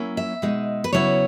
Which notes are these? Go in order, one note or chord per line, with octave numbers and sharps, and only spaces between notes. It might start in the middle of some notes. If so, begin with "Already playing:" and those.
Already playing: F#3 A#3 C#4 E4
E5
B2 G#3 D#4
B4
C#3 F#3 B3 E4 C#5